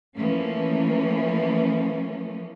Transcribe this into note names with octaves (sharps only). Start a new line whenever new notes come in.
E3 F3 A3 A#3 C#4